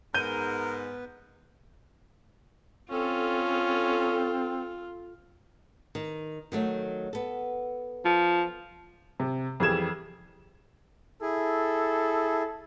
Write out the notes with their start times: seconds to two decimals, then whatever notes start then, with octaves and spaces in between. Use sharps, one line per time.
0.14 G#2 B3 A#4 B4 G6 D#7
2.91 C4 C#4 F4 A4
5.95 D#3
6.52 D#3 F#3 A3
7.13 B3 A4
8.05 F3
9.20 C3
9.60 F2 E3 G3 G#4 G#6 E7
11.22 E4 G#4 A4